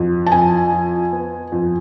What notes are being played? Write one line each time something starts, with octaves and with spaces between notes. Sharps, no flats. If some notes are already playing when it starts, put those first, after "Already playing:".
Already playing: F2
A5
F2 G#5
F3
B3
F2